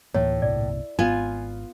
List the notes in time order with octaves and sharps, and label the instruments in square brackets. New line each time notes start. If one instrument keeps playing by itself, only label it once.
[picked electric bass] D2 E3 A#3 [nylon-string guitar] A2 [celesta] C#5
[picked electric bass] G1 C2 A#2 [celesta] D5
[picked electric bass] G#1 [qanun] B3 F4 [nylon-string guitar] G#5